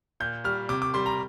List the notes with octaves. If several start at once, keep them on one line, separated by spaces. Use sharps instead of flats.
A#2 G6
G3 F6
C3 D6
D6
G3 C6
A#5